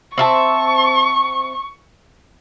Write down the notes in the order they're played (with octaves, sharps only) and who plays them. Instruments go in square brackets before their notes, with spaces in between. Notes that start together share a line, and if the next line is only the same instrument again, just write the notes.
[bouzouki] C4 E5 A5 [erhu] C#6